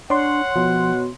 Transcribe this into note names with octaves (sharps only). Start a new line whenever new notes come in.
D4 C#5 F#5 C6
B2 F3